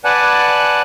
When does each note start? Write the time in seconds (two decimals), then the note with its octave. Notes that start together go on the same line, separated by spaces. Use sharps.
0.05 B4 D5 F#5 G#5 A5 F#6